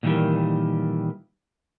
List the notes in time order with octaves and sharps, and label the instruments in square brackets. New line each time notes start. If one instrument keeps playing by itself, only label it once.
[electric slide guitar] A#2 D#3 E3 F#3 G3